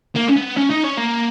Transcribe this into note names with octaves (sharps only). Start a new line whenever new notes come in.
A#3
C#4
B3
C#4
D#4
C#4
A#3